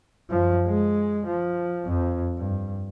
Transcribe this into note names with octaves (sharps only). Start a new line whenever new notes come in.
F#2 F3
G#3
F3
F2
G2